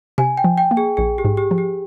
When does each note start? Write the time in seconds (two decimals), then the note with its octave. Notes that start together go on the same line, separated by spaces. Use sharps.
0.18 C3 G#5
0.37 G5
0.44 F3
0.57 G5
0.71 A#3
0.77 G#4
0.97 A#1 G#4
1.18 G4
1.25 G#2
1.37 G4
1.51 F3
1.58 G4